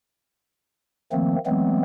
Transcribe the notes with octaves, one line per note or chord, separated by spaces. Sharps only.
D#3 F3 A3 A#3 C4
E3 F#3 G#3 A3 B3 C4